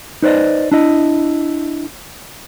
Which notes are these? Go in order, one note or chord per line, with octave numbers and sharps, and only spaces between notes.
D#4 B4 C5 D5 D#5
D4 E4 D#5